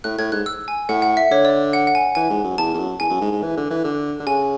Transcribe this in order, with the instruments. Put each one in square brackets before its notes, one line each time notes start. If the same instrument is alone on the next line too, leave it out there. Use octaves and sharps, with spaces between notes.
[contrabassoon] A2 [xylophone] F#6
[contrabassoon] A2 [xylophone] G#6
[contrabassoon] G#2 [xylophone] F#6
[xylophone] E6
G#5
[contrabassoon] A2 [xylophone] F#5
[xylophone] F#5
E5
[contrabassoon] D3 [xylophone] C#5
[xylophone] D5
F#5
F#5
G#5
[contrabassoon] E3 [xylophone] G#5
[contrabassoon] G#2
F#2
[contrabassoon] E2 [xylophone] A5
[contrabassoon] E2
F#2
[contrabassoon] E2 [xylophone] G#5
[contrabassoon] F#2
G#2
G#2
E3
D3
E3
D3
D3
[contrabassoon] C#3 [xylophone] G#5